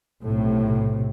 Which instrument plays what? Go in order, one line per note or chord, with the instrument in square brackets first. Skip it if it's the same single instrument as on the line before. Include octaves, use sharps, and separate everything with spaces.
[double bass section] B1 A2 C3